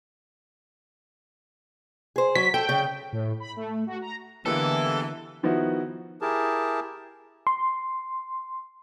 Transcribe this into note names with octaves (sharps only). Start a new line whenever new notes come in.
G#4 C5
F#3 B6
A4 G5
C#3
A2
B5
A3
F#4
A#5
D3 E3 G#3 A#3 B3 G4 A4
D#3 F3 B3 D#4 E4 F#4
E4 G4 G#4 A#4 A5
C6